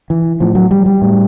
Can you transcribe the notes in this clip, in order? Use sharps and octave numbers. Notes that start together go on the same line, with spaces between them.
E3
A2 F3
F#3
G3
G3
A2